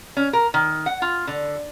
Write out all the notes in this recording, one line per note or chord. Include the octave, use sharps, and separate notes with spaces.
C#4
A#4
D#3
F#5
F4
D3